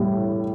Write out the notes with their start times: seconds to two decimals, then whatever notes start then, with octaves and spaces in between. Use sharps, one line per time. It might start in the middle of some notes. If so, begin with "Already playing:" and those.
Already playing: A2 G3